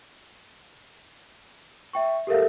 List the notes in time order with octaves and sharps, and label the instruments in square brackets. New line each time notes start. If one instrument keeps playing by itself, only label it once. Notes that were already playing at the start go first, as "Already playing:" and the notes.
[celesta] E5 G5 C#6
G4 A4 A#4 E5 F5